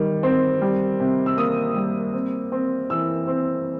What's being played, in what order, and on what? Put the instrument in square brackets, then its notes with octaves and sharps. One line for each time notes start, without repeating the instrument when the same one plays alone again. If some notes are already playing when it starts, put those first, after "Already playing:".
Already playing: [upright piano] D#3 G3
C4
G3
C3
E6
A#3 D#6
G3
C4
C4
E3 E6
C4